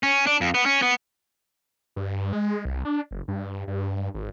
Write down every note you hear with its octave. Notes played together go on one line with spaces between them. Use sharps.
C#4
D4
F2
B3
C#4
B3
G2
G#3
C2
D4
F#1
G2
G2
G#1